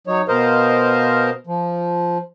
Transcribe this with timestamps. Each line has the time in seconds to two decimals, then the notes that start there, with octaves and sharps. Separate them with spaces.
0.07 F#3 D#4 C#5
0.28 B2 A#4 C5 D#5 F5
1.47 F3